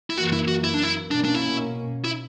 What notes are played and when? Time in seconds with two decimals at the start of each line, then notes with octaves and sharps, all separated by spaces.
0.10 E4
0.17 F#2 E3 A#3 F#4
0.33 E4
0.48 F#4
0.64 E4
0.74 D4
0.83 E4
1.11 B2 A#3 C#4 D4
1.25 D4
1.34 E4
2.05 E4